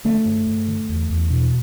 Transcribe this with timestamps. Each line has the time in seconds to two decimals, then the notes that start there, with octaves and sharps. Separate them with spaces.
0.05 D3 A3
0.26 G2
0.47 G2
0.68 D3
0.89 E2
1.10 E2
1.30 B2